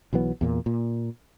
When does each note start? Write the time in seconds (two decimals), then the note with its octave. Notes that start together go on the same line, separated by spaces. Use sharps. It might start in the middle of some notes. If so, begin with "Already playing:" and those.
0.13 B1 E3 F#3 B3
0.41 E2 A#2 A#3
0.66 A#2